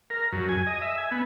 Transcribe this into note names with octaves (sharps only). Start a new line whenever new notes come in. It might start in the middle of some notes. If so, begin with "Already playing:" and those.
A#4
F#2
G#5
D#5
E5
G#5
B3